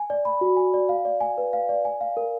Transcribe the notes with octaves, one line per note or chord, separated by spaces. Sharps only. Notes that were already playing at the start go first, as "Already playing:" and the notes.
Already playing: G#5
D5
B5
F#4
G#5
D5
F5
D5
G#5
B4
F5
D5
G#5
F5
A#4